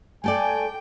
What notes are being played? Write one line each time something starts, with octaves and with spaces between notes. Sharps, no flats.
A3 A4 D5 G5 G#5